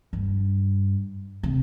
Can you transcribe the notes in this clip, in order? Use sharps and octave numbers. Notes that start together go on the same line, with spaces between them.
G2
C3